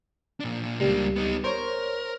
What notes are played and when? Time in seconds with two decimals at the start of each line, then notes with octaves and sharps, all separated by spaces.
0.40 A#2 D4
0.80 C#2 G3 A#3 D4
1.16 B3 D#4
1.44 A#4 C5 C#5